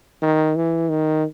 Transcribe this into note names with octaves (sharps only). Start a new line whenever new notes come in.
D#3
E3
D#3